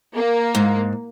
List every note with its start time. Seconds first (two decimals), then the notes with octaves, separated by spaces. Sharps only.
0.13 A#3
0.55 G#2